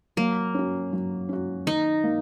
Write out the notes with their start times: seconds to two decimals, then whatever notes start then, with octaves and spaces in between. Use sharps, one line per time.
0.17 F#3 A#3
0.54 C#4 F#4
0.93 F#3
1.29 C#4 F#4
1.66 D#3 D#4
2.04 A#3